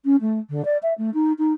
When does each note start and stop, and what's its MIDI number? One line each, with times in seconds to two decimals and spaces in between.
0.05 0.16 61
0.21 0.39 57
0.50 0.65 50
0.65 0.77 74
0.83 0.93 76
0.98 1.10 57
1.14 1.32 63
1.38 1.53 63